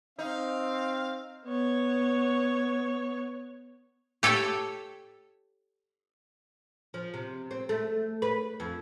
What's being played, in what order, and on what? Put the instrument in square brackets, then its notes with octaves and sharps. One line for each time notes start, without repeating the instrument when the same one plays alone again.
[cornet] C4 [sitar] D#4 [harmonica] F5
[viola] B3 C#5
[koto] G4 A4 C#5 E5 G5
[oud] F3
C3
C4
A3
B4
F2